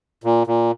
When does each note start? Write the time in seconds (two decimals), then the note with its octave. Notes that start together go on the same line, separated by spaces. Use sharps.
0.24 A#2
0.47 A#2